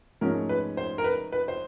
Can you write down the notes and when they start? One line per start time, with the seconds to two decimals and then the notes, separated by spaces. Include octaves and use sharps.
0.21 G#2 F3 A3 C#4 A#4
0.49 B4
0.77 C5
0.98 A#4
1.04 B4
1.32 B4
1.48 C5